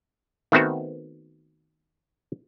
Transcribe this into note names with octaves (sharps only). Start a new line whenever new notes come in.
D#3 A3 B3 C4 F#4